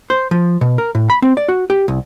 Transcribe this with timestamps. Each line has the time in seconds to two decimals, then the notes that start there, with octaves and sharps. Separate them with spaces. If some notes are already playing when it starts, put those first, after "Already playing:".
0.10 C5
0.31 F3
0.61 B2
0.78 A#4
0.95 A2
1.10 B5
1.22 C4
1.37 D5
1.48 F#4
1.70 G4
1.88 C2